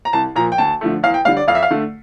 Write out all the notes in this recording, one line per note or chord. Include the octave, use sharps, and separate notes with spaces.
A#5
C2 A5
A#2 F3 A#5
G5
D2 A5
D3 F3 A3
E2 F5
G5
D3 G3 F5
D5
F2 F5
E5
F5
D3 A3